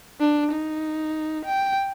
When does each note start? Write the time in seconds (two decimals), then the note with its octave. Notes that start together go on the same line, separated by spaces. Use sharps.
0.20 D4
0.52 D#4
1.45 G5